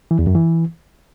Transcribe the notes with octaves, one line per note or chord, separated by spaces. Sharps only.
E3
E2
F#2
E3